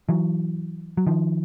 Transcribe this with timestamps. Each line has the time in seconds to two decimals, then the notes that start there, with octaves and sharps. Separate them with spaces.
0.09 E3 F#3
0.97 F#3
1.07 D#3 F3